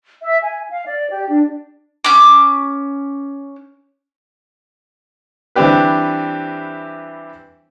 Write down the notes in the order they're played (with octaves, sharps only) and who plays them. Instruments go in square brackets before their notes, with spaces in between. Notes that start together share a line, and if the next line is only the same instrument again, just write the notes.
[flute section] E5
G#5
F5
D5
G4
D4
[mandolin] C#4 D6
[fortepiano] E3 G3 C4 D4 G4 B4